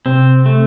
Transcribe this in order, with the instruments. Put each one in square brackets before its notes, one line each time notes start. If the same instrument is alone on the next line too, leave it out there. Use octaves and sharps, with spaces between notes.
[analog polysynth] C3 [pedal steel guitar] C4
[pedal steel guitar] A3